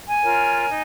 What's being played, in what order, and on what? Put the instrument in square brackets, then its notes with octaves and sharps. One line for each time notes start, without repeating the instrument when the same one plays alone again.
[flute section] G#5
F4 A#4 C#5
D#4